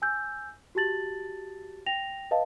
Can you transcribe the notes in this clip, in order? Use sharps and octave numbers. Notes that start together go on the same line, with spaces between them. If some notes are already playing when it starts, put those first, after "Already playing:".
G#5 E6 G6
F#4 G4 A5 A6 F#7
G5 A#6 F7
B4 D#5 F5 A5